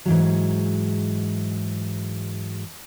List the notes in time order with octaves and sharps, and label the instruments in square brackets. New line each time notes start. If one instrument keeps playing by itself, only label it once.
[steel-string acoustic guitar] G#2 E3 F#3